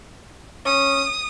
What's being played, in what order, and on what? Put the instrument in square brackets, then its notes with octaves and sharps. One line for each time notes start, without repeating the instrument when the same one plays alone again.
[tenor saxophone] C#4 [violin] D#6